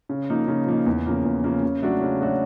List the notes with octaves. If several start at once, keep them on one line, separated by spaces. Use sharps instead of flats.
C#3
F3 A#3 D#4
C#3
F3 A#3 D#4
E2
C#3 F3 A#3
E2
C#3 F3 A#3
C#3
F#3 A3 D4 F#4
C#3
F#3 A3 D4 F#4